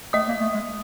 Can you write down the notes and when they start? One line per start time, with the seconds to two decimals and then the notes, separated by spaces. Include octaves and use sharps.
0.13 A3 D#5 D#6
0.28 A#3
0.41 A3
0.54 G#3